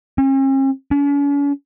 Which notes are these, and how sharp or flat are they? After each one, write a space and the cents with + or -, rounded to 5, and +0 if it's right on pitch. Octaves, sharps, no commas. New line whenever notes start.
C#4 -45
C#4 +45